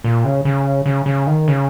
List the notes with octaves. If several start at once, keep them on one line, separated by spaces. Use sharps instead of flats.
A#2
C#3
C#3
C#3
C#3
D#3
C#3